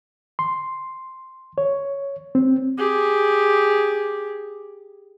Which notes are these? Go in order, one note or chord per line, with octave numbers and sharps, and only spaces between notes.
C6
C#5
C4
G4 G#4